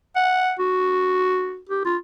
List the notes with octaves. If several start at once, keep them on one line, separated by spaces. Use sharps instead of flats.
F#5
F#4
G4
F4